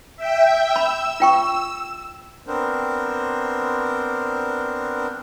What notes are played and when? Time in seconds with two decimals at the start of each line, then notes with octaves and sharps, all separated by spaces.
0.16 E5 G5
0.76 B5 E6
1.20 F4 G5 C#6
2.47 B3 C4 D4 A#4 C5